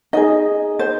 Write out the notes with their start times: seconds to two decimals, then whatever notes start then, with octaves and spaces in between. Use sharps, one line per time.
0.13 D#4 G#4 D#5
0.79 C5